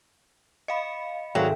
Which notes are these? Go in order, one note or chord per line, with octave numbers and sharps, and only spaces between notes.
D#5 F5 B5 C#7
G#1 G#2 F#3 A4 E5 F5 G5